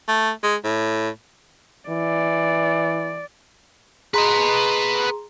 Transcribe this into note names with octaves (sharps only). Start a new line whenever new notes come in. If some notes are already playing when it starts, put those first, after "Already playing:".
A3
G#3
A2
E3 D5
G#4 B4 D#5 A#5 C6